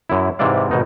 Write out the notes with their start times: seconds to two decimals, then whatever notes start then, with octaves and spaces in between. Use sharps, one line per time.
0.10 F#2 E4
0.39 G#2 C3 E3 E4 D5 F5
0.71 G#1 B2 D#4